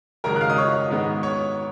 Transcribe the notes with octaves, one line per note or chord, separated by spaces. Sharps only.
G#1 F#2 C#3 G#3 A#4 A#5
F#6
F5 F6
D#5 D#6
C#5 C#6
G#2 D#3 G#3 B3 D#4
C#5 C#6